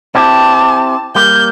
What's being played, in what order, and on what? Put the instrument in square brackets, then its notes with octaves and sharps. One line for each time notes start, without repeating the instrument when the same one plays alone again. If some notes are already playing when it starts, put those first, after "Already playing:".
[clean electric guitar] C4 E4 G4 [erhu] A5
[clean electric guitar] G3 A#3 [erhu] G6